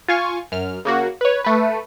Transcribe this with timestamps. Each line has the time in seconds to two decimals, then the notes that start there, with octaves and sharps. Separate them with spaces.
0.09 F4 F5 G#5 C#6
0.52 F#2 F6
0.85 C#3 A#3 F#4
1.21 B4 C#5
1.45 A3 B4